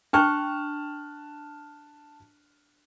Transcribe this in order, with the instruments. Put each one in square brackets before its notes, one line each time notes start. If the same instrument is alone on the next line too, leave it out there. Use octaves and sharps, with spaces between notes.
[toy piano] D4 G5 C#6 [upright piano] A5 F6 F#6